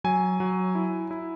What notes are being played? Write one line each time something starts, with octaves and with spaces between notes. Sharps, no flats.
F#3 G#5
F#3
E4
E4